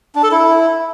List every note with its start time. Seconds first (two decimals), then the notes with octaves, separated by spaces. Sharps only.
0.15 D4
0.23 A4
0.31 E4